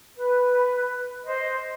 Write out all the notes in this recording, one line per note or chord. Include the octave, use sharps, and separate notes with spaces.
B4
C5 D#5